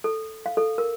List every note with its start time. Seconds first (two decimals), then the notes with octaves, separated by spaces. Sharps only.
0.04 A4
0.46 F5
0.57 A4
0.78 A#4